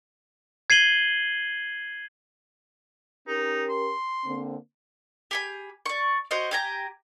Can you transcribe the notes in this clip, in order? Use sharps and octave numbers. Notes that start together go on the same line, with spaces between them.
G#6 C7 D#7 F#7 G7
C#4 D#4 G4 A#4
C6
D3 A#3 C4
G4 G#4 B5
D5 C#6
F#4 C5 C#5 D#5
G4 G#5 A#5